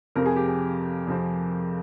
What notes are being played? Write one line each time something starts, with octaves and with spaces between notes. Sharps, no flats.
F2 C3 F3 C4 A#4
G#4
G4
G#4
F2 C3 F3 C4